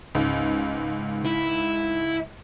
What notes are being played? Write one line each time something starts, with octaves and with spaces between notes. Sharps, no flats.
C#2 G#2
E4